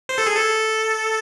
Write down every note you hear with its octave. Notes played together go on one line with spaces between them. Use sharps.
C5
A4
G#4
A4